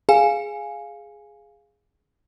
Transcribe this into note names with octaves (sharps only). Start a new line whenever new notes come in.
G#4 F5 G#5